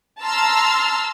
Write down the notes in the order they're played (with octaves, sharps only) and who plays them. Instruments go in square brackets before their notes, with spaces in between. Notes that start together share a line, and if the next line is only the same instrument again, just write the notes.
[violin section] A5 A#5 C6 E6 F6